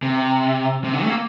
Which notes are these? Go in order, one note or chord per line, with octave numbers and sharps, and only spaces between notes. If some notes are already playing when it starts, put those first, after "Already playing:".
C3
C3
D3
A3
A#3